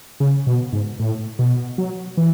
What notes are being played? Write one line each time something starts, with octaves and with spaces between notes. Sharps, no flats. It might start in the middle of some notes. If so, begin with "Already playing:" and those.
C#3
B2
G#2
A2
B2
F#3
E3